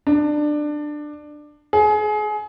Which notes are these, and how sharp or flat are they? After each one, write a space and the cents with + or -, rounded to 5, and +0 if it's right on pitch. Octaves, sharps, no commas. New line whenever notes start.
D4 +20
G#4 +30